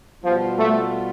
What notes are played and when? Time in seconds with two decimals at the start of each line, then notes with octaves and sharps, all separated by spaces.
0.23 B2 F3 G3 B3 F4
0.57 A3